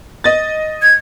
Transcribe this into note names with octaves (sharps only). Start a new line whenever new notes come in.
D#5 A6
G#6